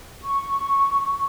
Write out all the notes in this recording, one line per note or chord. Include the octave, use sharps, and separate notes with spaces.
C#6